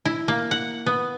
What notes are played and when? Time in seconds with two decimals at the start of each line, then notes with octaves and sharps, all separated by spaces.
0.05 E4
0.28 A#3
0.51 F#5
0.86 B3